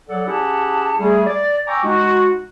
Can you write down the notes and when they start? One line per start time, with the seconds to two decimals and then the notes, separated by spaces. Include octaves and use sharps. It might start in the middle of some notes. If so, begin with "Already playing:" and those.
0.09 F#3 A4 D5 F#5
0.27 C#4 E4 G4 G#4 F#5 A5
0.99 G3 A3 G#4
1.26 D5
1.67 G5 G#5 A#5 C#6 D6 E6
1.84 G#3 D#4 F#4